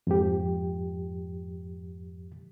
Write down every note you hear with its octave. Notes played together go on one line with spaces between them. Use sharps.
F2 G#2 F3 G4